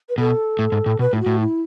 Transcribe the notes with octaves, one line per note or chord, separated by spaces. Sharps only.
B4
B2 A4
A2
G#2
A2
B2 B4
A2 E4
F#4
A2
E4